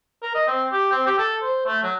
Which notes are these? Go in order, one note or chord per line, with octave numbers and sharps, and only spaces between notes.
A#4
D#5
C4
G4
C4
G4
A4
C5
A3
F#3